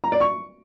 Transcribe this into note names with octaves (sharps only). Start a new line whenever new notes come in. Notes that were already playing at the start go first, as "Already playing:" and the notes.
A#5
D5
C#6